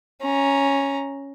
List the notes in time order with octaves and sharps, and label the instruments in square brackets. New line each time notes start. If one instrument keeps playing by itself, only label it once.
[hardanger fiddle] C#4 A#5